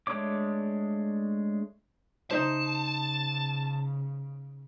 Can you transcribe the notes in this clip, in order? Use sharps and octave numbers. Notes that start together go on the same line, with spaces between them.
G#3 A3 D4 C#5 D6
C#3 D#4 C5 A5